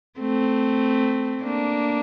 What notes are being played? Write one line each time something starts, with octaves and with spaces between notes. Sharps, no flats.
A3 C4
A#3 D4